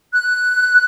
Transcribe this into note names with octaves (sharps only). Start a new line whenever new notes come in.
F#6